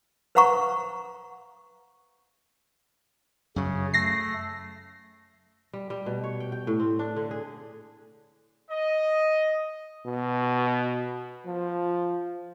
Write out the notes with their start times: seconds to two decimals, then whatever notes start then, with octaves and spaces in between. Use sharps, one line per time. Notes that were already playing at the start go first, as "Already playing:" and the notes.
0.35 B4 C5 F5 F#5 A#5 C#6
3.56 F#2 C#3 F#3
3.94 A3 A#6 C7
5.73 G3
5.90 G3
6.06 B2
6.24 C#5
6.40 G5
6.52 G5
6.67 A2
6.80 C4
6.99 D4
7.16 D3
7.31 G#4
8.70 D#5
10.06 B2
11.46 F3